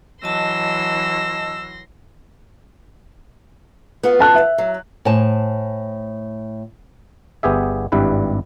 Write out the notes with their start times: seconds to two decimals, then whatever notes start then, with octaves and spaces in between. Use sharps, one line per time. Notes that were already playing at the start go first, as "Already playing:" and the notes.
0.24 E3 F#3 D#5 A5 C6 E6 A#6
4.03 B3 F4 F#4
4.19 B4 A5 F#6
4.35 E5
4.58 F#3
5.05 A2 C5 G#5 A5
7.43 G1 B3 G4 G#4 E5
7.92 G#1 G2 G3 E4 B4